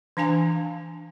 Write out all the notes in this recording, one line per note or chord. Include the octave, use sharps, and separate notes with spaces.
E3 D4 F5 G#5 A5